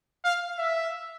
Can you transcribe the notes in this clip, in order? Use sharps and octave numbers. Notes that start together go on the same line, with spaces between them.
F5
E5